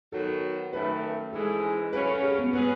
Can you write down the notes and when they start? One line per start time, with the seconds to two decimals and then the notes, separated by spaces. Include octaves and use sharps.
0.12 D#3 F#3 B3 F#4 A4
0.73 F#2 D#3 A3 B4
1.33 G#2 E3 G#3 C#4 A4
1.93 C#3 F#3 C#4 B4
2.08 A4
2.23 G#4
2.38 B3
2.53 F#3 B3 C#4 G#4 B4